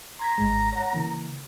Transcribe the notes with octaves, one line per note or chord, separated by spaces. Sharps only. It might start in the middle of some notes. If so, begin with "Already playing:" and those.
A#5 C6 G#6 B6
G#1 G#2 G#3
C#5 F#5
C#3 E3 A#3